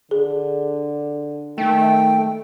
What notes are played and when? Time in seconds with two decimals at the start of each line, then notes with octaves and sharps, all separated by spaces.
0.11 D3 G#4
1.58 D#3 A3 G5